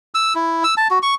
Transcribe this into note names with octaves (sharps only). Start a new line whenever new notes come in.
E6
E4
E6
A5
F#4
C#6